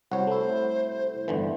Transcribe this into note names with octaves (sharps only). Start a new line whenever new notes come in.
C2 F#4 C5 C#5
A3 E4
G1 D3 E3